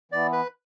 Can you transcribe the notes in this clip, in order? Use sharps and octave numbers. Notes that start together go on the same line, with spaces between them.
E3 B3 E4 D5
B4